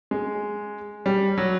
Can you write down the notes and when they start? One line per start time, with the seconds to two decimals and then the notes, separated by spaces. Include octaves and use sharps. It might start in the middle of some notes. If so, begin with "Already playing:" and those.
0.11 G#3
1.06 G3
1.38 F#3